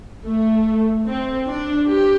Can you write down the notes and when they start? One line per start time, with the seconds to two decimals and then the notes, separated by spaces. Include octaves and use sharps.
0.25 A3
1.06 C4
1.47 D4
1.88 G4